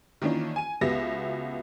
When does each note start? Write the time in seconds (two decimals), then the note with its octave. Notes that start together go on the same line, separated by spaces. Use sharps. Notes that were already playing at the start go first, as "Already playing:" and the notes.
0.22 D#3 E3 A#3 C#4 D4 F4
0.56 G#5 D#7
0.81 C#2 B3 F#4 G4 E5 A#6